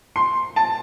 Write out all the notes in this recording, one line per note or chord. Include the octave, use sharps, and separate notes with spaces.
C6
A5